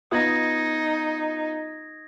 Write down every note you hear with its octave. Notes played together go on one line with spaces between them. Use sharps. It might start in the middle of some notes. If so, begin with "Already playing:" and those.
B3 D#4 F4 D#6 G#6 A#6